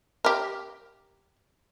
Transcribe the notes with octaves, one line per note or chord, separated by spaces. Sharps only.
G4 A#4